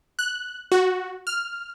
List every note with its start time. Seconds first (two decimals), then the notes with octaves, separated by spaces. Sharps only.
0.19 F#6
0.72 F#4
1.27 F6